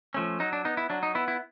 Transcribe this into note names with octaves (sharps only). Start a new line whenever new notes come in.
F3 A3 C#4
F#3 D#4
D4
B3 D#4
E4
F#3 D4
D#4
B3 E4
E4